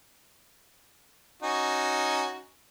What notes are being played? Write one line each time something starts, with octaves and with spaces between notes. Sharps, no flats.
C#4 D#4 F#4